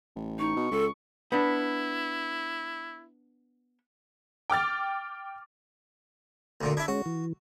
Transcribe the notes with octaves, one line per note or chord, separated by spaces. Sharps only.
A1
D#4 C#6
B2
C#2 A4
B3 D4 E4
G5 D6 F6 A6
D2 A#2 D3
D4 E4 B5 G#6
G#3 C#4 F#4
E3